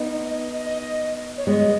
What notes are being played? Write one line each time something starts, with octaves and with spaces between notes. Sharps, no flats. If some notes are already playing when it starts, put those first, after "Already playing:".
Already playing: B3 D#4
D#5
D#5
C#5
G#3 B3 D#5